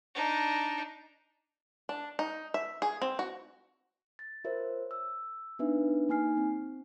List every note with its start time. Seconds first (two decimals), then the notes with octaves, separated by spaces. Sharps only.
0.15 D4 D#4
1.89 D4
2.19 D#4
2.54 E5
2.82 G#4
3.02 C4
3.19 F#4
4.19 A6
4.44 F4 A#4 C5 C#5 E5
4.91 E6
5.59 B3 D4 D#4 B4 E5
6.09 A#3 D#4 G#5 F6 C7
6.37 C4